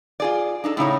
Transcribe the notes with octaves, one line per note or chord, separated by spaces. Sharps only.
F4 G#4 D5
D4 D#4 A4
A2 C#3 D#4 C#5